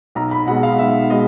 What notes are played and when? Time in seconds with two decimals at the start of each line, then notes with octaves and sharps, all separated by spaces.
0.15 B1 A#5
0.31 B5
0.47 B2 G#3 B3 F#5
0.63 F5
0.79 B1 E5
1.10 B2 G#3 B3 D#5